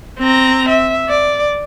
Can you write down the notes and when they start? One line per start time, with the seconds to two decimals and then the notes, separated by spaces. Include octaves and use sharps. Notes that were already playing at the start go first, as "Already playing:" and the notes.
0.19 C4 A#5
0.68 E5
1.09 D5